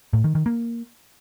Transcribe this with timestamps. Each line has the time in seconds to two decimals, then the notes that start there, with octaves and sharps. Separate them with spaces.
0.13 A2
0.24 D#3
0.35 D#3
0.46 A#3